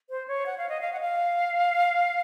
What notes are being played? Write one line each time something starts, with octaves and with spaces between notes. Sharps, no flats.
C5
C#5
F#5
F5
D#5
F5
F#5
F5